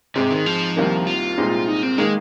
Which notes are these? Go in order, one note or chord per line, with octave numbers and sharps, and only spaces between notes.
G#2 C3 G#3 C4
D#3
F3
C2 C3 D#3 A#3 D#4
F4
C2 A#2 G#3 C4 D#4
D#4
C4
D#3 G#3 A#3 D#4